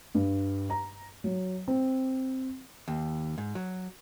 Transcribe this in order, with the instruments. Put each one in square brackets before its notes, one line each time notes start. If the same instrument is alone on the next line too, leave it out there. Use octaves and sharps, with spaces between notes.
[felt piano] G2
A#5
F#3
C4
[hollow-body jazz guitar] D#2
G#2
F#3